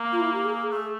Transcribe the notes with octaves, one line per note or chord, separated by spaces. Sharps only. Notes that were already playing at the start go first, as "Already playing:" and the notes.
Already playing: A#3
F4
E4
G4
G#4
A3 G#4